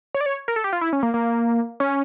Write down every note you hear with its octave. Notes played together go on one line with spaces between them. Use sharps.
C#5
D5
C#5
A#4
A4
G4
F4
E4
C#4
A#3
A#3
C#4